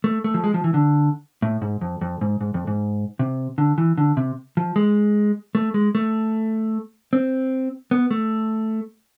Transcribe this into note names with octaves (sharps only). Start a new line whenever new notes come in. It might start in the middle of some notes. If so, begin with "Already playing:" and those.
A3
A3
F3
G#3
F3
E3
D3
A2
G#2
F2
F2
G#2
G#2
F2
G#2
C3
D3
E3
D3
C3
F3
G#3
A3
G#3
A3
C4
B3
A3